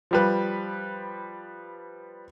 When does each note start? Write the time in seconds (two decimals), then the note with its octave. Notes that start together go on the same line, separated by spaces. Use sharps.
0.11 F3 G3 B4